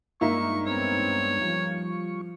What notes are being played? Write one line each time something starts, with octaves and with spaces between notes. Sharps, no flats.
G2 G#3 A#3 D4 D#4 E5 C#6
B3 C4 C#5
F3 G3 F4 C#6